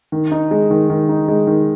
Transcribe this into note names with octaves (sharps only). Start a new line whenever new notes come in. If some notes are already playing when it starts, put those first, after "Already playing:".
D#3
D#4
G#3
D#3
D#3
D#4
G#3
D#3